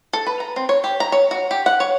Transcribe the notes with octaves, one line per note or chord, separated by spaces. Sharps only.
A4
B4
A#5
C4
C#5
G4
A#5
C#5
F#4
G4
F#5
C#5